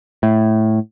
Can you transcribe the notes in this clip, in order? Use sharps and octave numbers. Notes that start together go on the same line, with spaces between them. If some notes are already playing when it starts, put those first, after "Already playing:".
A2